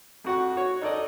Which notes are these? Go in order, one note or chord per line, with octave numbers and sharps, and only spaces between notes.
F2 F#4 F#5
F#4 C#5
D#4 A4 D5 D#5